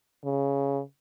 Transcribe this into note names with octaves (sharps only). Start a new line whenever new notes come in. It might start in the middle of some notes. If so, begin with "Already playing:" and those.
C#3